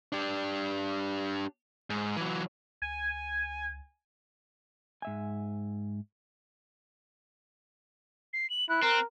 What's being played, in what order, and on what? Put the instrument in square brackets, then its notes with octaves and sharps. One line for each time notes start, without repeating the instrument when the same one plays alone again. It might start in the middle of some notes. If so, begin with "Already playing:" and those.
[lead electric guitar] D4 G4
G#2
E3 F#3
[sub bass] C#2 [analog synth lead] G#5
[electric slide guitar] G#2 E5 G#5
[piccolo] C7
F#7
[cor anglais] E4 [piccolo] F#6
[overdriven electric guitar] C4 [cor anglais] A#4